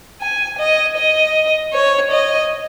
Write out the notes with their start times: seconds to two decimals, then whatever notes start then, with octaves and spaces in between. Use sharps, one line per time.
0.21 G#5
0.59 D#5
0.97 D#5
1.73 C#5
2.11 D#5